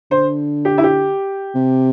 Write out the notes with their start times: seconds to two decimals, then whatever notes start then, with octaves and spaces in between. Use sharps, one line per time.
0.11 D3 C5
0.65 G4
0.78 E4
0.84 G4
1.55 C3